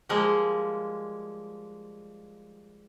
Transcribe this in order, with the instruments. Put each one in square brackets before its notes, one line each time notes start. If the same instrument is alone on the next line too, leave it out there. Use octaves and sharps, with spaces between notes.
[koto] F3 G3 G#3 A#3